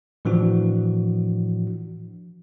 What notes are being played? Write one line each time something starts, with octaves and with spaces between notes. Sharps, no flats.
A2 E3 F3 D4 F#4